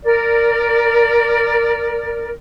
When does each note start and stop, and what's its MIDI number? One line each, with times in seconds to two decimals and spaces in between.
0.03 2.30 70
0.03 2.30 74